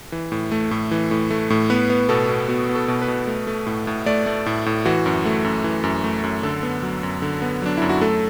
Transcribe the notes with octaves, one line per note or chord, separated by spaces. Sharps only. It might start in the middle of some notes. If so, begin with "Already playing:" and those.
E3
A2
A3
A2
E3
A2
A3
A2
B3 B4
B3
B2 A4
B2
B3 F#4
B3
A4
B2
B4
B2
A3
A3
A2
A2
A3 D5
A3
A2
A2
E3 F#4
F#2
A3
F#2
E3
F#2
A3
F#2
D3 A4
B3
F#3
F#2
D3
B3
F#3 D4
F#2 E4
F#4
A3 A4